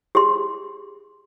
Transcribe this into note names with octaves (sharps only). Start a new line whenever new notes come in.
G4 G#4 C6